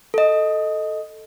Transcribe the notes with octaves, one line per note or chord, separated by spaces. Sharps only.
A4 D#5